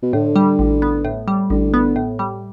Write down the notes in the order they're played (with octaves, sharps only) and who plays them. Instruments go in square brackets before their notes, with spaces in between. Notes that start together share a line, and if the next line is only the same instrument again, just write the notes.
[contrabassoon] B2
[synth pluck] A2 [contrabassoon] D3
[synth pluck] G3
A1
B3
A2
G3
[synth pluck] A1 [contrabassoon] D3
[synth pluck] B3
A2
G3